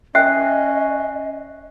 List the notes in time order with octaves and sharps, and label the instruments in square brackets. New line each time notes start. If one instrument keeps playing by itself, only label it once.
[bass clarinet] C#4 [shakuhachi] D#5 [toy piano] E5 G5 [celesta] F#6 C7